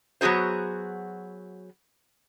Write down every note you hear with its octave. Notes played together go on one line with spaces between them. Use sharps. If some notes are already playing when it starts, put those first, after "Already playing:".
F#3 B3 F#4 G#4 C5